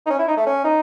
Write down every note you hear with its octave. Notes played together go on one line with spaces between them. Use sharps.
D#4
C#4
E4
D#4
A3
C#4
D#4